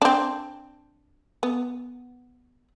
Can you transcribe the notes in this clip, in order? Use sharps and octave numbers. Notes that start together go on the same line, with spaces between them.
C4 D4
B3